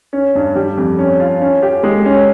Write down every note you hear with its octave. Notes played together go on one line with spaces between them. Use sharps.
C#4
G2
G3
F2
C#4
F4
C#4
G4
G#3
C#4